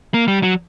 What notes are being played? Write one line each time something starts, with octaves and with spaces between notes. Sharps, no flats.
A#3
G3
F#3